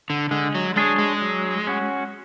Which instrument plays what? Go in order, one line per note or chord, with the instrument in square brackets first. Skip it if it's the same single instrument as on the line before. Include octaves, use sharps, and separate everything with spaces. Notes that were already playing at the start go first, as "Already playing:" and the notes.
[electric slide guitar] D3
[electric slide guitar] D3 [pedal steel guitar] G#3
[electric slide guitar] F#3
[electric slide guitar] G#3 [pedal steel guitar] D4 G#4 C#5
[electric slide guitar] G#3
[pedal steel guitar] F#3
C#4 F#4